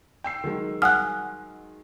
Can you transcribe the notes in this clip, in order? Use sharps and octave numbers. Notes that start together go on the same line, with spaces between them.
G5 E6 C7
D#3 F#3 G#3
F#5 G#5 D#6 F6 F#6